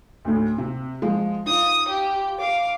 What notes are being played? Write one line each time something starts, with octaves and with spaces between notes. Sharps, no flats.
D2 A2
C3
F3 G#3
D#4 F4 D#6
G4
F5 D6